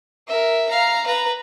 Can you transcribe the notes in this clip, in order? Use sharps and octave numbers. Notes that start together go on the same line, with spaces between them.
A#4 E5
F5 A#5
B4 A#5